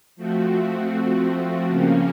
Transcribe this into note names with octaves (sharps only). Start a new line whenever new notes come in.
F3 A3 C4 F#4
C#3 F3 A#3 C#4